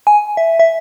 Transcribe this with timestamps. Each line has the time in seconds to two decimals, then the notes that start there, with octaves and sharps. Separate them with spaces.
0.07 G#5
0.37 E5
0.59 E5